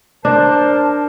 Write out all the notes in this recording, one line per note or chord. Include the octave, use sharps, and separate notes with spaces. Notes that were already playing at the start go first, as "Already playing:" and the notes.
D4 A#4 C5 A5